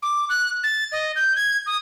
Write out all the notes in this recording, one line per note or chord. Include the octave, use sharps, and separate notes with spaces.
D6
F#6
A6
D#5
G6
G#6
D#6